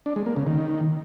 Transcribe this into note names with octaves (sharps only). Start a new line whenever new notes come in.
D4
G#3
A#3
C#3
D#3